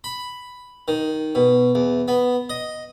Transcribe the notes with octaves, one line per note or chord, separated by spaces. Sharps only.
B5
D#3
B2
E2
B3
D#5